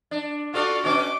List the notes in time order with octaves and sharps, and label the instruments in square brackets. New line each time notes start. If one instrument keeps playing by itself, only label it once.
[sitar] D4
[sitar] F4 A4 D5 [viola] F#4 F5
[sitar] B2 C#4 D4 [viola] D6